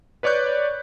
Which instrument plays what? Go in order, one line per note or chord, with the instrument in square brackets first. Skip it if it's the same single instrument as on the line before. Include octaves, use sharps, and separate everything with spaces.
[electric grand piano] B4 C#5 D5 C#6 F#6 G6